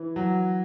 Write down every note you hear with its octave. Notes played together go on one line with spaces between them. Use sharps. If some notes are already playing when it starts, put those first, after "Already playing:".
Already playing: E3
F#3